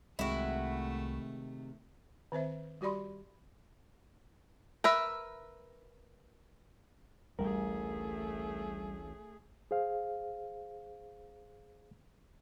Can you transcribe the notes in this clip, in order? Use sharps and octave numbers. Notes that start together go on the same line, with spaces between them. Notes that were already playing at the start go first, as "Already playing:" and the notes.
C2 C3 D#3 G#3 A3 E4 F#4
D#3 C4 C5 E5
G3 F#4 G4 D5 B5 C6
A#4 B4 E5
A1 D2 G3 A3 G#4 A#4
G#4 C5 F5